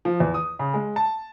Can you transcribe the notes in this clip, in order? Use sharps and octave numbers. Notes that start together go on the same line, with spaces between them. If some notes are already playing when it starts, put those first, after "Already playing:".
F3
E2
D#6
C#3
G#3
A5